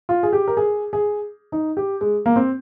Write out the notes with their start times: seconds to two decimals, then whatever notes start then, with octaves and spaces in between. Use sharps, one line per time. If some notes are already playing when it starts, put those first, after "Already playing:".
0.09 F4
0.23 G#4
0.33 G4
0.48 A#4
0.57 G#4
0.93 G#4
1.52 D#4
1.77 G4
2.01 G#3
2.26 A#3
2.36 C4